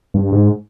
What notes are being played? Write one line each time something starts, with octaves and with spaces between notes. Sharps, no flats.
G2
G#2